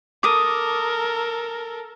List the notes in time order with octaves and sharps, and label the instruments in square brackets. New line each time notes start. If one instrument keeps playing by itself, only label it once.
[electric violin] A4 A#4 [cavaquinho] D6 D#6